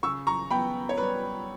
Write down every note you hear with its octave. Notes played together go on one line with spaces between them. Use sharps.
C#3 C#6 E6
A#5 C#6
B3 G5 B5
C#5
G3 B4